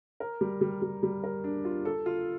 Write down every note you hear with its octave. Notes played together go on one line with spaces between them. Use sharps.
A#4
G3
G3
G3
G3
A#4
D4
F4
A4
F4